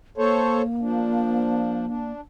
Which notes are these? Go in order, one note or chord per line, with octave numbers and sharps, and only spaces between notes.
A#3 A4 C5 C#5
F3 D4
D4